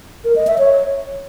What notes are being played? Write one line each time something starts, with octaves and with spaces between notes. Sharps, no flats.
A#4
D#5
E5
C#5